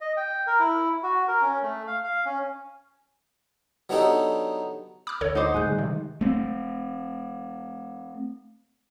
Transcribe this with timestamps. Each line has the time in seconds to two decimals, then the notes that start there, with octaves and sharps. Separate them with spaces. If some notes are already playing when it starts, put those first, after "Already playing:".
0.01 D#5
0.17 G5
0.47 A#4
0.60 E4
1.03 F#4
1.28 A#4
1.41 C#4
1.63 A3
1.87 F5
2.04 F5
2.25 C#4
3.89 F#3 B3 D4 D#4 G4 A4
5.07 B5 D6 F6
5.21 D2 A4 C#5
5.35 D#4 C5 F#5 D6 D#6
5.54 A2 G#3 G#5 F#6 G6
5.66 D3 G3 G#3
5.78 C3 D#3
6.21 A3 C4